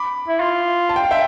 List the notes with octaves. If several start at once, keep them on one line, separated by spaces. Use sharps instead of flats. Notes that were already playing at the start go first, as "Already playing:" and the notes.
Already playing: B5 D6
E4
F4
A5
G5
F5
E5 G5